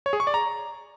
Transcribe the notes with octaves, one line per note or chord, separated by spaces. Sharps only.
C#5
G#4
C#6
D5
A#5